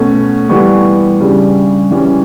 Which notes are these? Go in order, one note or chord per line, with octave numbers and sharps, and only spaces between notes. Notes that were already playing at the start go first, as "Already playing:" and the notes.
Already playing: B2 A3 C#4
E3 G3 B3 C#6
C#3 G3 D4
E3 G3 C#4